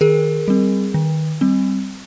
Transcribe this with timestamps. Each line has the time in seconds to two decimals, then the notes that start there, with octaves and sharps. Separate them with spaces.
0.01 D#3 G#4 A#4
0.48 G3 C4
0.94 D#3
1.41 G3 C4